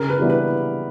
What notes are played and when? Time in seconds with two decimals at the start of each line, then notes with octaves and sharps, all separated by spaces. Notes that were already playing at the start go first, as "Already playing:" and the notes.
Already playing: C#3 A#4
0.10 B4
0.19 E3 G3 B3 E4
0.30 B4